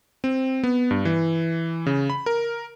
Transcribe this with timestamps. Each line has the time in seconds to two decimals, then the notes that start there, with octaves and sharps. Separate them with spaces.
0.24 C4
0.63 B3
0.91 G2
1.05 E3
1.86 C#3
2.10 B5
2.26 A#4